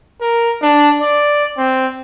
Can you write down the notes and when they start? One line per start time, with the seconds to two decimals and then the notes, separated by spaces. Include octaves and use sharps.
0.21 A#4
0.62 D4
1.02 D5
1.58 C4